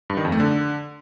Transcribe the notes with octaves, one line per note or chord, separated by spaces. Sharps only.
G2
D#3
F2
A3
D3